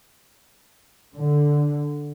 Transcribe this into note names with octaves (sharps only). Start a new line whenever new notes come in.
D3